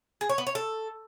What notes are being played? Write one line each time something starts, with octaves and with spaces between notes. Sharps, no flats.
G#4
C#5
B3
C#5
A4